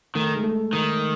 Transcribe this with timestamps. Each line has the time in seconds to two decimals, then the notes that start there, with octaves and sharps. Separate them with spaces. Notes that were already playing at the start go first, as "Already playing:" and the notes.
0.15 D#3 A3
0.36 G#3
0.44 A3
0.73 D#3